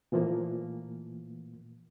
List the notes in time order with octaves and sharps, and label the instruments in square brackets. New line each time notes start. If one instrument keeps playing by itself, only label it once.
[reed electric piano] A#2 E3 F3 A3 A#3